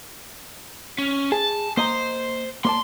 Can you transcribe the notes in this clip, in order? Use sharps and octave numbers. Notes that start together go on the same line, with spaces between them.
C#4
G#4 A5
A#3 C5 D#5 A#5
A#3 D5 A5 C6